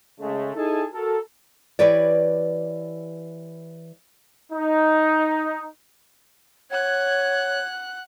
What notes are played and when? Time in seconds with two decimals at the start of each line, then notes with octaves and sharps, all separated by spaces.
0.20 C#3 G#3 A3
0.56 D#4 E4 G#4 A4 G#5 A5
0.94 F#4 A4 A#4
1.79 E3 G4 B4 C#5 D5
4.52 D#4
6.71 C#5 F#5 F#6 G#6